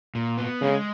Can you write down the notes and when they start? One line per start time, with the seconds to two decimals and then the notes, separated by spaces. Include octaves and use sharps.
0.15 A#2
0.38 B3
0.61 C#3 G#3